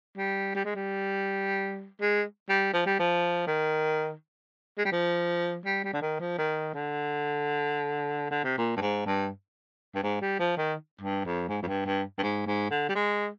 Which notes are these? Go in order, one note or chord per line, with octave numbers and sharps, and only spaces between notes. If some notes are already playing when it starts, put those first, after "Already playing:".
G3
G3
G#3
G3
G#3
G3
F3
G3
F3
D#3
G#3
G3
F3
G3
G3
D3
D#3
F3
D#3
D3
D3
C3
A#2
G2
G#2
G2
G2
G#2
G3
F3
D#3
G2
F2
G#2
F2
G2
G2
G2
G#2
G#2
D3
G3
G#3